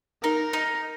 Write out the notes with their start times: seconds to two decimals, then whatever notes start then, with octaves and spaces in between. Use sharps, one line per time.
0.23 D#4 A#4
0.53 D#4